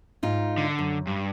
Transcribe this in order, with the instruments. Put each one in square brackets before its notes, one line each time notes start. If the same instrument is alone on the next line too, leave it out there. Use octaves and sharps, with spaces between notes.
[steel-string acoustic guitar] G#2 D#4 F4
[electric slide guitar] D3
[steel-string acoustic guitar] F#2
[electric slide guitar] G2